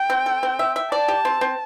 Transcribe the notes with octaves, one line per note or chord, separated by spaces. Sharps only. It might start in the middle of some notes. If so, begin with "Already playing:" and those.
Already playing: G5
C4
A4
C4
E5
E5
D5 A5
G4
C4
C4